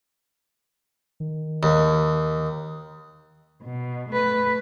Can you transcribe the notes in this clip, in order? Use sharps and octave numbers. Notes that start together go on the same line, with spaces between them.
D#3
D#2
B2
A3 B4